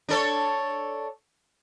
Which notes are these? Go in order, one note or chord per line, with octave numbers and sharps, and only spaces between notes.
D4 A4 C#5